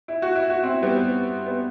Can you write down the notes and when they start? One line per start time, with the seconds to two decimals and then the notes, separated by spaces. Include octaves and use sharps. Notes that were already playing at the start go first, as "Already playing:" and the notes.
0.08 E4
0.22 F#4
0.35 E4
0.50 F#4
0.63 C4 E4
0.82 G3 B3
1.46 B3